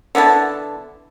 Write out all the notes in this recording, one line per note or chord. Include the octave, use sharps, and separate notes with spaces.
D3 B3 E4 A5